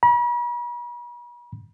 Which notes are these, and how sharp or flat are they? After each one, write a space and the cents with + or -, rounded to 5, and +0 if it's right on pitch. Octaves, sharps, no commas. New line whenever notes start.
B5 -45